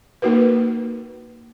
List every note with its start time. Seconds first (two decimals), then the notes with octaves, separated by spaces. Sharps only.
0.22 A#3 D#4 F#4 A#4 B4